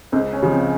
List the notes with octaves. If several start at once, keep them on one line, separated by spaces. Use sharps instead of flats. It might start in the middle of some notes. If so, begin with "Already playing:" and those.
C#2 C5
C#4
C#3 F3
C4